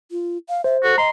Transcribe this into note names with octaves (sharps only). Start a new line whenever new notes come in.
F4
F5
C5 E5
F#4 A4
D#5 A#5 C6